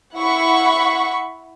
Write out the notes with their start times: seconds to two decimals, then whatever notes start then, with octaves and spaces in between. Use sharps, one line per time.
0.15 E4 F#5 B5 C#6